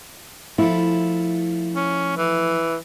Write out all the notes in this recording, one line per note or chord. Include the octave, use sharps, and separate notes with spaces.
F3 A3 E4
C#4
E3